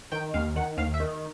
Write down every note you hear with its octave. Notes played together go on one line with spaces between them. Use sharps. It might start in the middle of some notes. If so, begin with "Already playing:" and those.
D#3 G5
D#2 F5
D#3 F#5
D#2 F5
E5
D#3